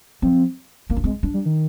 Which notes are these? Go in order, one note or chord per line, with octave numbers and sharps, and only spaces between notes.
F3 C4
A#3 C4
D4
G#3 C4
D4
G3
D#3